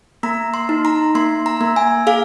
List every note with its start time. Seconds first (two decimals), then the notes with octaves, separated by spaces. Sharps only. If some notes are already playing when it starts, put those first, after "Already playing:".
0.23 A#3 A#5
0.54 C6
0.69 D#4
0.85 A#5
1.15 A#3 C6
1.46 A#5
1.61 A#3
1.76 G#5
2.07 G#4 F5